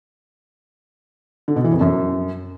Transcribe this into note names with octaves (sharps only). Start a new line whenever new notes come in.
D3
B2
E3
F2
F#2